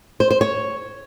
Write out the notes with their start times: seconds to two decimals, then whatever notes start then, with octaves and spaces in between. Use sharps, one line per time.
0.20 C5
0.31 C5
0.41 C#5